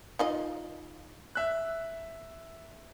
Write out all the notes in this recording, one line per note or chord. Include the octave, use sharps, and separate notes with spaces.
D#4 F4 D#5
E5 F#6